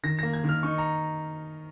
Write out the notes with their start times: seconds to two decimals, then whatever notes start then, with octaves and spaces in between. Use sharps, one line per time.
0.03 D#3 A#6
0.19 A#3 A#6
0.33 G#6
0.44 D#3 F6
0.63 D#4 C#6
0.78 A#5